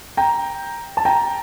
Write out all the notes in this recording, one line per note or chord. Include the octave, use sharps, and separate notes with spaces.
G5 A#5
A5
G5 A#5